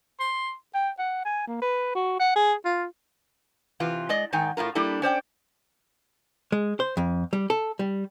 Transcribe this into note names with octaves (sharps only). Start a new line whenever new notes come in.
C6
G5
F#5
G#5
A#3
B4
F#4
F#5
G#4
F4
C3 E3 F4
G#3 D5 D#5
G#2 D#3 D#4 G5 G#5
A2 E4 F4 A#4
G3 A#3 D4 E4 A4
C#4 C5 D5 G5
G#3
C5
F2
G3
A4
G3